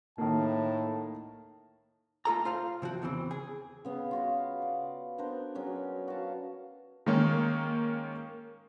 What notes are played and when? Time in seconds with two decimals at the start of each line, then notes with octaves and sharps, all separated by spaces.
0.18 A2 D#3 A#3 A5
2.25 A3 F4 A4 A#5
2.45 F4 C5 F5
2.82 C3 F3 C4 F#4
3.02 E2 C#3 E3 C4
3.31 G#4
3.85 C#3 B3 F5
4.11 F4 F#4 F5
4.62 D5
5.18 B3 D4 A#4 C5
5.55 F#3 C#4 D4 G#4
6.08 F#4 F5 A5
7.06 D#3 G#3 A#3 C#4